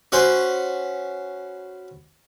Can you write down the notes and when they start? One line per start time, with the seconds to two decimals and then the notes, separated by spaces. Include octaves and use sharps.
0.12 C#4 F#4 B4 C5